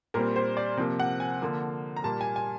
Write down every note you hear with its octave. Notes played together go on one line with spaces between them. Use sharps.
A#2 G3 C4 A#4
C5
D5
C3 F3 A#3
F#5
G#5
D3 F3 A#3
A#5
A#2 G3 A#3 A5
G#5
G#5